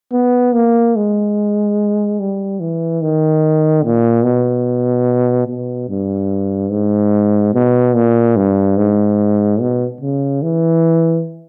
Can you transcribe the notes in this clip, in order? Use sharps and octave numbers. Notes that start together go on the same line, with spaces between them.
B3
A#3
G#3
G3
E3
D#3
A#2
B2
B2
G2
G#2
B2
A#2
G2
G#2
B2
C#3
E3